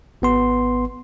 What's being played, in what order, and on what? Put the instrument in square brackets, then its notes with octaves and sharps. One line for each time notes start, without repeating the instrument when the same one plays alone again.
[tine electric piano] G#1 B3 C6